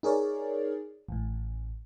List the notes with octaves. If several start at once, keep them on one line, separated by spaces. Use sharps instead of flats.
D#4 G#4 A#4 C#5 D5
A1 A2